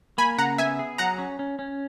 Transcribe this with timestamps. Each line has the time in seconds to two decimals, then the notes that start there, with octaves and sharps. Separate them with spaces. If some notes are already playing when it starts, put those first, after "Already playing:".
0.18 A#3 G#5 B5
0.38 C#3 F#5 A#5
0.58 B3 E5 G#5
0.79 G#4
0.98 F#3 F#5 A#5
1.18 C#4
1.39 C#4
1.59 C#4